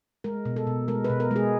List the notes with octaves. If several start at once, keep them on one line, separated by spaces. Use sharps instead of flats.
G#3 A#4
B2
A4
B2
G#3 A#4
B4
B2
A#4
G#3 G#4